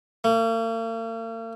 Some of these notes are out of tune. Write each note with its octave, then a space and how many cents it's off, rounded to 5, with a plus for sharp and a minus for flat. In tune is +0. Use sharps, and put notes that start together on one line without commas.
A#3 -45